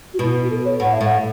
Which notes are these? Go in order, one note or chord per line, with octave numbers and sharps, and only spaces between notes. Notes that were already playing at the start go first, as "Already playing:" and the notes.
F#4
B2 E4
F#4
A4
C#5
A2 F#5
E5
A2
F#5